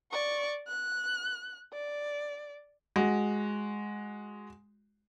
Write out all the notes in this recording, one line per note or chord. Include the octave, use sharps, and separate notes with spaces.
D5 C#6
F#6
D5
G#3 F#4